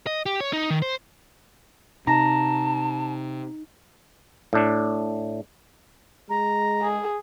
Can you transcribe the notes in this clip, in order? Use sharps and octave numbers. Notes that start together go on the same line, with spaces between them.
D#5
G4
C#5
D#4
D#3
C5
C3 D#4 A5 A#5
A2 D4
G#3 A#5
G#4